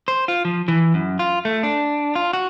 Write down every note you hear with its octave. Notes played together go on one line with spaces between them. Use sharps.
C5
F4
F3
E3
F#2
F4
A3
D4
F4
F#4